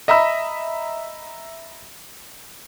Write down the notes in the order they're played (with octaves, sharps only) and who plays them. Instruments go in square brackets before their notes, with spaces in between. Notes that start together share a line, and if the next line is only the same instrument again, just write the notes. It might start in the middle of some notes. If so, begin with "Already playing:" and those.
[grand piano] D#5 E5 A#5 B5 E6